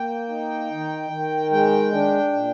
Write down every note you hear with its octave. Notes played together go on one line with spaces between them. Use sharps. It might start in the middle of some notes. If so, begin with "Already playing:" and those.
Already playing: A#3 G5
D#4
D#3
D#3
G#3 G5
D4
A#2